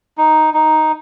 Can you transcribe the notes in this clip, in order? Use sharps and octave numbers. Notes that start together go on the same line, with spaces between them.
D#4
D#4